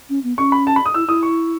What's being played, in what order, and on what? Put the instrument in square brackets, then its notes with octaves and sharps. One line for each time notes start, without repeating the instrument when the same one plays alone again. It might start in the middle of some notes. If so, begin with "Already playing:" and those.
[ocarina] C#4
B3
[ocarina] C#4 [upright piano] C#6
[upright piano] B5
A5
B5
D#6
[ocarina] E4 [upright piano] E6
[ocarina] E4 [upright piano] D#6
[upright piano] C#6